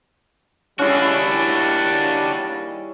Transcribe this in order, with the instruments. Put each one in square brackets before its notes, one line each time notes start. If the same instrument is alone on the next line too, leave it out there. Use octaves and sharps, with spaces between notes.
[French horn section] D#2 G3 [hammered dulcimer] C#4 E4 G#4 [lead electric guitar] D4 F#4